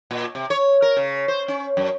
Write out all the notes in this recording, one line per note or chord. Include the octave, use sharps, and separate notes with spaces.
A#2
C3
C#5
A#4
C#3
C5
C#4
F#2